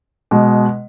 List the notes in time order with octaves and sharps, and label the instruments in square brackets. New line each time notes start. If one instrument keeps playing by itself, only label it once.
[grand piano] B2 G#3